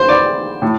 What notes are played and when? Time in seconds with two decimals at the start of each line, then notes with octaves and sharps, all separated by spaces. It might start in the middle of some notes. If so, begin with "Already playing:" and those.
Already playing: C5
0.09 D5
0.62 A2